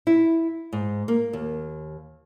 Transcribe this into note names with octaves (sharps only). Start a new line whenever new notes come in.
E4
G#2
A#3
D#2